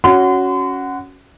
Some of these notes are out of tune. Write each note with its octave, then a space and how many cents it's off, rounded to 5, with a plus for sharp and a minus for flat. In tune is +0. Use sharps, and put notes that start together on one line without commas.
C#4 +5 F#4 +0 C6 -40